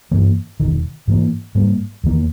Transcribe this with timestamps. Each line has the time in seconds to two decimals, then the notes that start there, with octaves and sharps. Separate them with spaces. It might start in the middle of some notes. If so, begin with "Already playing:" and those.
0.11 G2 E3 A#3
0.60 E1 E2 D#3
1.08 G#2 E3 A#3
1.55 G#2 G3 A#3
2.04 E2 D#3 A#3